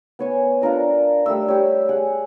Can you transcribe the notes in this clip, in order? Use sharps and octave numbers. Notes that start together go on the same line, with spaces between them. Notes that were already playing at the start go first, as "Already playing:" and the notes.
B3 C#5 G#5
D4 F4 A#4 D#5
G3 A3 E5 E6
G4 C#5
G#4 F#5